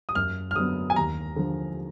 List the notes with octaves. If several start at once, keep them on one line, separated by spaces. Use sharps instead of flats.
D#6
F#2 F6
F6
D3 F#3 B3 D#6
G#5
D#2 A#5
D3 F3